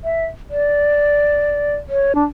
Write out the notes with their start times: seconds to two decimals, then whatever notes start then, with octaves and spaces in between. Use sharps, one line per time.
0.04 E5
0.50 D5
1.89 C#5
2.15 D4